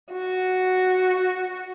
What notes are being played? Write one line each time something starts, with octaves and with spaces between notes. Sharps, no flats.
F#4